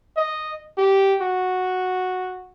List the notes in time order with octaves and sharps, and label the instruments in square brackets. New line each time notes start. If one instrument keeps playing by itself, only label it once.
[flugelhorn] D#5
G4
F#4